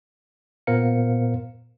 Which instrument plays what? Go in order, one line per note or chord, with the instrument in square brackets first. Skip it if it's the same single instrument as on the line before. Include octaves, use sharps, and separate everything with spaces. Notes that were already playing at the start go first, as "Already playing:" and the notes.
[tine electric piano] A#2 B3 A#4 C5 F5 C#7